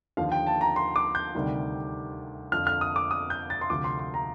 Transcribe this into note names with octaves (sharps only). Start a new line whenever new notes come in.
D#2 D3 F3 F5
G5
A5
A#5
C6
D6
G6
D2 C3 D#3 G3
F2 D3 F3 F6
F6
D#6
D6
D#6
G6
A6
C6
D2 C3 F3 D6
C6
C6
A#5